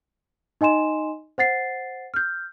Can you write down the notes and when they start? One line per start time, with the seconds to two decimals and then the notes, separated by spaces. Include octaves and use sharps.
0.61 D#4 D#5 G#5 C6 E7
1.38 C5 F#5 A6 C7
2.14 F6 G6